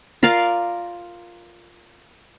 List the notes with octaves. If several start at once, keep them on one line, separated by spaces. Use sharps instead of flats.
F4 A#4 D5 F5